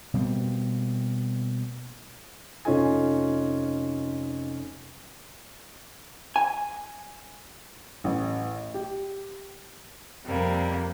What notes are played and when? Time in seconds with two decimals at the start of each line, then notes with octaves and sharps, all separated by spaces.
0.14 B2 G3 A#3 C4
2.65 F1 C#4 D#4 F4 A4 G#5
6.36 G#5
8.04 A1
8.74 G4
10.26 F2 C3 G3 A#3